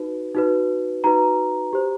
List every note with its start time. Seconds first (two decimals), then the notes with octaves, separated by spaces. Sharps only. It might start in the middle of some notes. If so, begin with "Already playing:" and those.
Already playing: D#4 F#4 B4
0.35 D#4 F#4 B4
1.04 D#4 F#4 B4 A#5
1.73 G4 C5